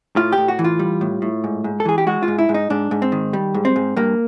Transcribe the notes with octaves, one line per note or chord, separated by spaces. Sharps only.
A2 F4
G4
A2
F#4
E3
F4
G3
A2
A2
G#2
G#2
A4
E3 G#4
G4
G#3 F#4
F4
G#2
E4
G#2
D#4
G#2 D4
G#2
C4
D#3
G3
G#2
C4
G#2
G2 A#3